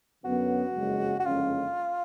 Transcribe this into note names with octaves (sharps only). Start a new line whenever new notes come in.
F#2 D3 F#3 B3 F#4
F#1 F2 C#3 G#3
F#4
F#1 F2 D3 G#3 C#4 F4